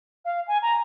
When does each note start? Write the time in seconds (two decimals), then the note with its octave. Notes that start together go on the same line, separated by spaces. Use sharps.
0.25 F5
0.48 G#5
0.62 A#5